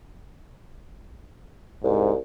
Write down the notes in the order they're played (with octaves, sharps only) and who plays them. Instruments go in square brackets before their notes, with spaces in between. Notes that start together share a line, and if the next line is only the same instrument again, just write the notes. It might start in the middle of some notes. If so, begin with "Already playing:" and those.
[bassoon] C2 [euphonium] G#2